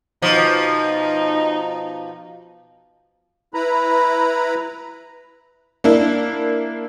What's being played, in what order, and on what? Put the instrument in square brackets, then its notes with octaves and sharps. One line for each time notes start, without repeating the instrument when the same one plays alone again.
[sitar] B2 F3 [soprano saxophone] D#4
[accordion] E4 B4 A#5 B5
[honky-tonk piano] A#3 D4 E4